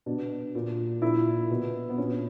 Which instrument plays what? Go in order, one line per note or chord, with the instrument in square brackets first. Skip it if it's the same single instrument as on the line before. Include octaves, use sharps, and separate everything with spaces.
[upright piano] B2 D4
A#2
A#2 E4
B2
B3
A#2 C#4